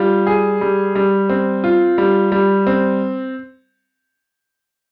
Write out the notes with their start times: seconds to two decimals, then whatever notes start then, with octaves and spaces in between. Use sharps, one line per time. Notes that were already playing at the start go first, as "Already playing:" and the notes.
Already playing: G3 F4
0.27 G#4
0.61 G3
0.95 G3
1.29 C4
1.64 F4
1.98 G3
2.32 G3
2.67 C4